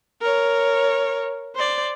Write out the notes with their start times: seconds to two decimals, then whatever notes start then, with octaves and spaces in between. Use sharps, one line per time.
0.21 A#4 C#5
1.56 C5 D5